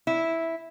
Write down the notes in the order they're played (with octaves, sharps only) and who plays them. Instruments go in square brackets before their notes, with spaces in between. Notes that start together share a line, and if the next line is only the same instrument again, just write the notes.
[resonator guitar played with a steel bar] E4